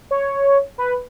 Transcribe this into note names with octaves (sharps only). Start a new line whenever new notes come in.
C#5
B4